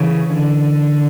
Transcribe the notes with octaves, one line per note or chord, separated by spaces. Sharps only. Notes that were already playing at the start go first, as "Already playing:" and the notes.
Already playing: C#3 E3
D3